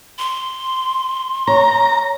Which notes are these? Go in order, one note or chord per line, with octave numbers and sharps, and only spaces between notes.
C6
C#5 A#5